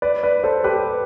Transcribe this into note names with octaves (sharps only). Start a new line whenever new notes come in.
B4 D5
B4 D5
A4 C5
G4 B4